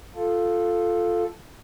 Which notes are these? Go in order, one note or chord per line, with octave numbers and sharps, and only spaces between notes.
F4 A4